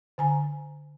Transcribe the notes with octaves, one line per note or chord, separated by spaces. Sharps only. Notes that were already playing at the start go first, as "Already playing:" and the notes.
D3 G#5 A#5